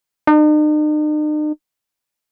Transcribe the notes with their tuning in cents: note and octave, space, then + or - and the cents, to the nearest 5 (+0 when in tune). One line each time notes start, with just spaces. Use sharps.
D#4 -45